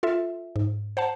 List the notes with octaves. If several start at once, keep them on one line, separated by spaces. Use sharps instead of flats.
F4 A4 E5
G#2
C5 F#5 A5